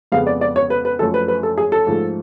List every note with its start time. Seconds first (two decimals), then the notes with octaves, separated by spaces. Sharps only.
0.12 F2 C#3 G#3 B3 F5
0.27 D5
0.41 D5
0.56 C#5
0.70 B4
0.85 B4
0.99 F#2 F3 A3 A4
1.14 B4
1.28 B4
1.43 A4
1.58 G#4
1.72 A4
1.87 G#2 F3 A3